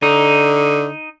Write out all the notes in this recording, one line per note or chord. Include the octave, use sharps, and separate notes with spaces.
D3 D#4